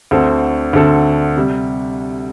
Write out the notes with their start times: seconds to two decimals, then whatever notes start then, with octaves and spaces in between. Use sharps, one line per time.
0.11 D2 D3 C4 A4
0.73 D2 D3 C4 A4
1.37 C3 G3